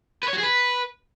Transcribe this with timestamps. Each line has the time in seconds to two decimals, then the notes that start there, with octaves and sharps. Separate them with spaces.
0.23 B4
0.28 C#5
0.33 F#4
0.38 G#4
0.43 B4